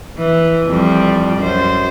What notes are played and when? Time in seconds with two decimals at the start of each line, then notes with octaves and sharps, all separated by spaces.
0.18 E3
0.66 F2 G3
1.37 F#2 C5